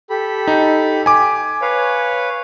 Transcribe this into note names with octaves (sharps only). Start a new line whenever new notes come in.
G4 A4 B5
D#4
G#5 D6
B4 C#5 F5